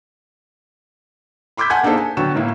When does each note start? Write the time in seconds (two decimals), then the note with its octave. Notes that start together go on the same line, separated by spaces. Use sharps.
1.57 B5 C6 D6 E6 G6 B6
1.70 F#5 G#5 A5 G6 G#6
1.83 A#3 D4 D#4 G#4 A4 C5
1.97 G#5
2.17 D3 F#3 B3 G5 C#6 E7
2.35 A2 A#3 E4